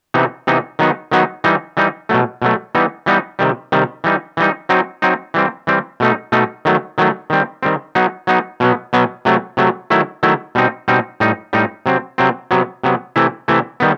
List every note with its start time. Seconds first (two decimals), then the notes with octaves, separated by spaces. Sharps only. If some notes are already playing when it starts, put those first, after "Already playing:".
0.14 C3 E3 B3 D#4
0.47 C3 E3 B3 D#4
0.79 D#3 F#3 B3 D#4
1.12 D#3 F#3 B3 D#4
1.44 E3 G3 D#4
1.77 E3 G3 D#4
2.09 B2 F#3 A3
2.42 B2 F#3 A3
2.75 E3 G3 B3 D#4
3.06 E3 G3 B3 D#4
3.39 C3 D#3 G3
3.72 C3 D#3 G3
4.04 E3 G3 D#4
4.37 E3 G3 D#4
4.69 F#3 C4 D#4
5.02 F#3 C4 D#4
5.34 E3 G3 C4
5.67 E3 G3 C4
6.00 B2 A3 D#4
6.32 B2 A3 D#4
6.65 D#3 F#3 A3
6.98 D#3 F#3 A3
7.30 D#3 G3 C4
7.63 D#3 G3 C4
7.95 F#3 B3 D#4
8.27 F#3 B3 D#4
8.60 B2 F#3 B3
8.93 B2 F#3 B3
9.25 C3 F#3 A3
9.57 C3 F#3 A3
9.90 D#3 F#3 A3 E4
10.23 D#3 F#3 A3 E4
10.55 B2 G3 C4 D#4
10.88 B2 G3 C4 D#4
11.20 A2 G3 D#4
11.53 A2 G3 D#4
11.86 C3 F#3 C4
12.18 C3 F#3 C4
12.51 C3 F#3 B3
12.84 C3 F#3 B3
13.16 C3 E3 A3 E4
13.48 C3 E3 A3 E4
13.80 D#3 G3 B3